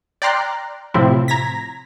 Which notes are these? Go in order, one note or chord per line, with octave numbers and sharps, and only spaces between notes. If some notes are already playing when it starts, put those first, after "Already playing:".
D5 G5 A#5 C6 F6 F#6
A2 C3 F3 C4 E4
A#5 G#6 A#6 B6